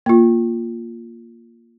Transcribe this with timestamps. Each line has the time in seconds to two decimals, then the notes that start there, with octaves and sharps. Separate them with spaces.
0.06 A#3 F4